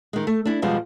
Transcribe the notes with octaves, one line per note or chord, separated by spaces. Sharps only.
D#3 G#3
A3
D4 E4
E2 B2 F3 G3 G#3